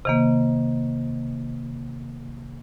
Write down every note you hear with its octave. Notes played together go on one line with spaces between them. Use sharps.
C3 D#3 A#3